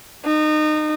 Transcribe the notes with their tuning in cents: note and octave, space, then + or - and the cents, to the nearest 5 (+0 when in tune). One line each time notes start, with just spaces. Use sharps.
D#4 -25